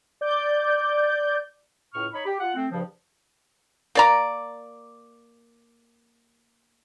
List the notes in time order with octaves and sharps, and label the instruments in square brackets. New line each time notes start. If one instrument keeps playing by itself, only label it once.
[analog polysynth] D5 G6
[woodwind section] C#2 A2 C#6 F6
D#4 C#5 B5
G4
F4 F#5
A3 C4
G2 C#3 F3
[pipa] A#3 D5 A#5